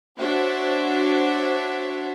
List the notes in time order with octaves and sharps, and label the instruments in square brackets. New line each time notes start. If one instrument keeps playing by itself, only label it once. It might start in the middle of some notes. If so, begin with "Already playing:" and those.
[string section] D4 F#4 C5 C#5 E5